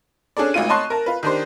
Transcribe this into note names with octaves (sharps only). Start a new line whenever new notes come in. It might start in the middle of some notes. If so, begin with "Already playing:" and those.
C#4 D4 G#4 A4 D5
G#1 D2 F4 D#7
C#5 D#5 A5 C6 C#6 F#6
A#4 A5
F4 B4
D#3 D4 G4 C5